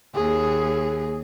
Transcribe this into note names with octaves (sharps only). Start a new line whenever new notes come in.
D#2 G#4